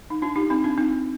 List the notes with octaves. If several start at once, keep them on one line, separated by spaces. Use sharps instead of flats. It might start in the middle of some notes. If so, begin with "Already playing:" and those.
D#4
D4 F4
D#4 G4
C4 D#4
D4 F4
C4 D#4